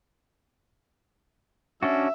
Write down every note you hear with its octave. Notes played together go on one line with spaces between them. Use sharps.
C#4 D4 F#4 E5